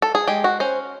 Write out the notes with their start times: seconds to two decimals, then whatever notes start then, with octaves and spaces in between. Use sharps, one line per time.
0.02 A4
0.15 G#4
0.28 G#3 G4
0.44 F#4
0.60 C#4 C5